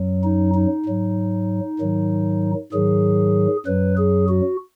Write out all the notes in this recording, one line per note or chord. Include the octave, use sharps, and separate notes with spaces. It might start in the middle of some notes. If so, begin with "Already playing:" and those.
Already playing: F#2 F#3
D#4
D#4
G#2 F#3
G#2 D#3 F#3
G#2 D#3 F#3 G#4
F#2 F#3 B4
G#4
F#4